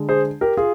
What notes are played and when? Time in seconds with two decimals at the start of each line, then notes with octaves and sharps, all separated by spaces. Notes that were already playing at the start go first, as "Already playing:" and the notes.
Already playing: D3 G#3
0.09 G#4 C5
0.41 G4 A#4
0.57 F4 G#4